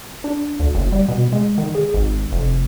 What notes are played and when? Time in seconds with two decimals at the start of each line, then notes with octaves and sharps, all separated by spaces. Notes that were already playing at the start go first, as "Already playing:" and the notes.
0.24 D4
0.59 D2
0.75 F#1
0.92 G3
1.08 B2
1.33 G#3
1.58 D#3
1.75 G#4
1.94 G#1
2.32 F1